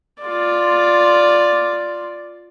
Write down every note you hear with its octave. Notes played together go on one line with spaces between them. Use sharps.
F4 D5